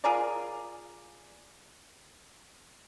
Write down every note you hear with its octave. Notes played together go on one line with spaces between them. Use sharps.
F4 G#4 A#4 D5